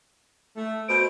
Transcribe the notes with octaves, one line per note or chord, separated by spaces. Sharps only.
A3
B2 C5 D7